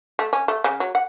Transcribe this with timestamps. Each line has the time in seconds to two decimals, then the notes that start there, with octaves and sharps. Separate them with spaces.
0.19 A3
0.33 C#4
0.48 A3
0.64 C#3
0.80 F#3
0.95 F#5